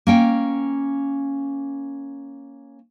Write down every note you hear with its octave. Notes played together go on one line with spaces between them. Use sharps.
A#3 C#4 G5